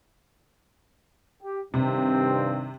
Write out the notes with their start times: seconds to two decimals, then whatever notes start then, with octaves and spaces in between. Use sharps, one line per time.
1.43 G4
1.74 G2 C3 D#3 C4